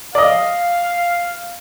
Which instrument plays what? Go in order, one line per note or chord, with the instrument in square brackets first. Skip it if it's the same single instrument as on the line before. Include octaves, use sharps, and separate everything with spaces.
[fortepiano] D5 D#5 [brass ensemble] F5